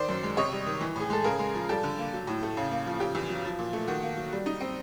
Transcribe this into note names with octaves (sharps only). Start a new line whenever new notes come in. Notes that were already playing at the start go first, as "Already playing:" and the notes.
Already playing: D#3 C5 D5
F#2
G#3
C3 C#5 D#5
G3
D#3
E3
A2 G#4
G#3 A4
C#3 G#4 A#4
G#3
F3
G3 G4 A4
D3
A#3
F#3
A2
A3
C#3
A#3
F3
C#3 G4
E2
F#3
F3
A#2
A3
D#3 F#4
A#3
F#3
G3
D#4
C4